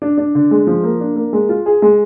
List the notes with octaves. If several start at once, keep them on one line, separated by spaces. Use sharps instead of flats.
D4
D4
D3
G#3
F3
A#3
D4
A#3
G#3
F4
G#4
G#3